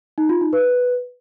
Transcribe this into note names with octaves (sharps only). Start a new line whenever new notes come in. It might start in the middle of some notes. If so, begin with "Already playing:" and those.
D#4
F4
D#4
B4